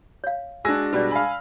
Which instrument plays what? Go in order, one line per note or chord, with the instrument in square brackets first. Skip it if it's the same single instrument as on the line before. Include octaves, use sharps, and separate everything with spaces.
[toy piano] C#5 F5
[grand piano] G#3 D4 [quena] F#4 [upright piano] G#5 E6 A#6
[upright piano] B2 G3 [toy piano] B4 D5
[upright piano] F5 B5 [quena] G#5